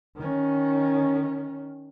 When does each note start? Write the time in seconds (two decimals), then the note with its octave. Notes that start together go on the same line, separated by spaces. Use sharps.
0.16 D#3 C#4